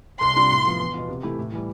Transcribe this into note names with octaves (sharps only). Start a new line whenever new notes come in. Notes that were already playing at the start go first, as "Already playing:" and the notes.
C2 C6
C3 G3 D4 F4
A2
F3 B3 F4
E2
B2 B3 F4
C3
E3 A3 E4 G4
A2
E3 G3